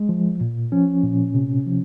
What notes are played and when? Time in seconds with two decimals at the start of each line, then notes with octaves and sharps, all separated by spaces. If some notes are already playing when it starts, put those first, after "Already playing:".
Already playing: G#3
0.09 F3
0.41 A#2
0.72 F3 C#4
1.03 A#2
1.35 C3
1.67 F3